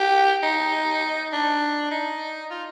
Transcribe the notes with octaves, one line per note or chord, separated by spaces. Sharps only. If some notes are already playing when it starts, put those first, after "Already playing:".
Already playing: G4
D#4
D4
D#4
F4